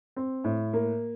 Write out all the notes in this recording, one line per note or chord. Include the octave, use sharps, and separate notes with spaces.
C4
A2
A#3